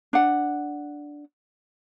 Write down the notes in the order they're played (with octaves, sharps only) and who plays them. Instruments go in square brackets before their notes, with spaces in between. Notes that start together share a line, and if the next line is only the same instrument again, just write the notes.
[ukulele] D4 F#5